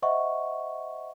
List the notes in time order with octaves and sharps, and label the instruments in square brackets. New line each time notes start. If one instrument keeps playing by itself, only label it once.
[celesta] C5 D#5 E5 F#5 C#6